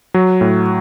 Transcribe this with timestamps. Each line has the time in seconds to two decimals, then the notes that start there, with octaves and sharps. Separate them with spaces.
0.14 F#3
0.41 A2